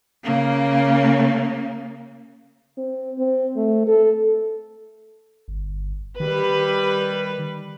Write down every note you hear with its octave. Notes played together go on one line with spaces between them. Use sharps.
C#3 A#3
C4
C4
A3
A4
G1
D#3 G3 B4